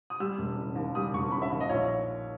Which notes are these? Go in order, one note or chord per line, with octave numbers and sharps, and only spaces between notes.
D#6
G3 E6
E1
C#3
D#2
G3 D#6
E1 C#6
C#3 B5
E5
D#2
D#5
A#1 C#5